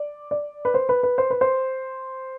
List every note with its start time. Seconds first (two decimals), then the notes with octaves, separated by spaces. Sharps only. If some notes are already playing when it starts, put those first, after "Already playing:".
Already playing: D5
0.31 D5
0.65 B4
0.74 C5
0.89 B4
1.03 B4
1.18 C5
1.30 B4
1.41 C5